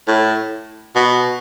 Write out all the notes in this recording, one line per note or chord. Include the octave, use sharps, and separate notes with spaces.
A2
B2